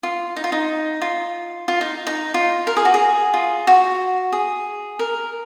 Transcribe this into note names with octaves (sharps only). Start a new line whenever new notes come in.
F4
D#4
F4
D#4
F4
F4
D#4
D#4
F4
A#4
G#4
F#4
G#4
F4
F#4
G#4
A#4